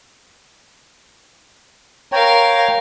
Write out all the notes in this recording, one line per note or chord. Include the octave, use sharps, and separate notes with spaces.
A#4 C#5 F5 G5